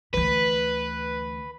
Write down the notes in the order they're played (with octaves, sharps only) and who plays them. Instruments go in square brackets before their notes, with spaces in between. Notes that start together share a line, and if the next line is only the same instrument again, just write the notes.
[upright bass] D2 E3 [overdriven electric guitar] B4